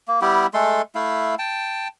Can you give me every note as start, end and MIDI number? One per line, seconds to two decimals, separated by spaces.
0.08 0.20 58
0.22 0.47 55
0.22 0.47 59
0.22 0.47 64
0.22 0.47 67
0.54 0.82 56
0.54 0.82 57
0.54 0.82 69
0.54 0.82 84
0.95 1.35 57
0.95 1.35 64
0.95 1.35 77
1.38 1.88 79
1.38 1.88 81